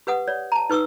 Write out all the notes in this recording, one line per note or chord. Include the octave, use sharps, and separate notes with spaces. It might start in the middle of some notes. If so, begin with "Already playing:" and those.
G4 B4 F#5 D#6
C#5 D5
A5 A#5
D#4 B4 C#6 D#6 E6